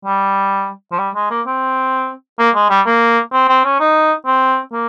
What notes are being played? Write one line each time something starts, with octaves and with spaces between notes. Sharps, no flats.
G3
F3
G3
G#3
A#3
C4
A#3
G#3
G3
A#3
C4
C4
C#4
D#4
C4
A#3